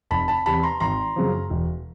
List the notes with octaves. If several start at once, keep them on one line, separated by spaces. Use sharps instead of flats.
F1 A5 B5
A5 B5
E2 C3 A5 B5
A#5 C6
G#1 A#5 C6
F#2 C#3 F3
E1